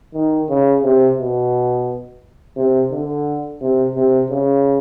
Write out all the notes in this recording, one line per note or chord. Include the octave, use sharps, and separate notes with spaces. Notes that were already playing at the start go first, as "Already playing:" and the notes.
D#3
C#3
C3
B2
C3
D3
C3
C3
C#3